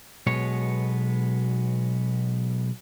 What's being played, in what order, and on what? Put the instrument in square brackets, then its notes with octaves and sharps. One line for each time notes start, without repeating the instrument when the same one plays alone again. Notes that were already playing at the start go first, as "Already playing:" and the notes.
[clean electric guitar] B1 B2 G#3 B3 C#5